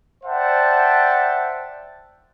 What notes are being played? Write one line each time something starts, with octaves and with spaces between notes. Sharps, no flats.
C5 D5 E5 F#5 G5 A5